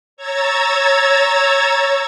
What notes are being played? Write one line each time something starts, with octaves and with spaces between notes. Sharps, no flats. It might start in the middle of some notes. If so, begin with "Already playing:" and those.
C#5 A#5 E6 G#6 A6